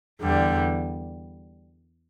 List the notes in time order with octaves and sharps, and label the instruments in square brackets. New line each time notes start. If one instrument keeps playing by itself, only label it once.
[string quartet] E2 D3 G3